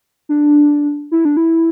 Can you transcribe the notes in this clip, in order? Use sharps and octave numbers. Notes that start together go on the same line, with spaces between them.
D4
E4
D4
E4